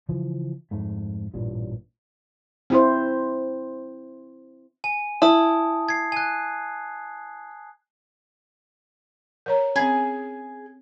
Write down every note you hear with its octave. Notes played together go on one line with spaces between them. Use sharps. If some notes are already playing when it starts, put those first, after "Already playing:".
C#3 E3 F3
F2 G#2 A3
A1 G2 A#2
C4 E4 C5
G#5
E4 A5 D#6
G#6 C7
G#5 F#6
A#4 C#5 A#5
C4 C#4 G#4